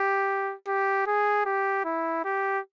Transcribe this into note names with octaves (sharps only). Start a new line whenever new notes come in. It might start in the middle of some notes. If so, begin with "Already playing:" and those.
Already playing: G4
G4
G#4
G4
E4
G4